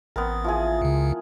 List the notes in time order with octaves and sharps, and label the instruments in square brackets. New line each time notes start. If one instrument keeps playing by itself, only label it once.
[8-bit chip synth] A1 [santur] B3 C4 A#4
[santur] F3 E4 G#4
[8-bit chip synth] C#2 C#3